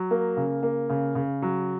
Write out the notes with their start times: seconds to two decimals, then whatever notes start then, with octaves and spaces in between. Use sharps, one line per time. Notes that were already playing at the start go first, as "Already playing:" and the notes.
Already playing: F#3
0.11 A#3
0.37 C#3
0.63 A#3
0.89 C#3
1.15 C#3
1.42 F#3